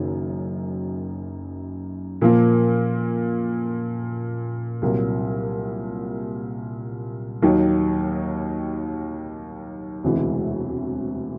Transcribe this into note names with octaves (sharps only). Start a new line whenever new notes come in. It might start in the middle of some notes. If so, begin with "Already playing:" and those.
Already playing: F#1 F#2 D#3
A#2 F3 A#3
C2 A#2 F#3 A#3
D#2 D#3 F#3
E1 D2 C3 E3 G#3